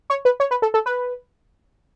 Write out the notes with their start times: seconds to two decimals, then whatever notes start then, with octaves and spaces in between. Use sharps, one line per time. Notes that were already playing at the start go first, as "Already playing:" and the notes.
0.10 C#5
0.25 B4
0.40 C#5
0.51 B4
0.62 A4
0.74 A4
0.86 B4